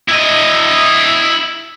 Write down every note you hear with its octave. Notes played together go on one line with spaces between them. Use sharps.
E4 D#5